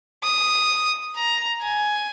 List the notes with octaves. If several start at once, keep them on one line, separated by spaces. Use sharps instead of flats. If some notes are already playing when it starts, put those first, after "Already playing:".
D#6
A#5
G#5